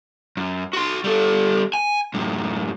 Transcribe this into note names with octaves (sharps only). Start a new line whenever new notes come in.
F#2
F#4 C6
G3 A4
G#5
F#2 A2